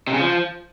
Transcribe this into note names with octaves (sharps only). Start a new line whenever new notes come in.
C3
C#3
F3